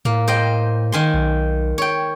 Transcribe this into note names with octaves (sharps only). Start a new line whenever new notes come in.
A2 A#3
C5 D#5 G5
D#3 G#5 C6
B1
C#5 G5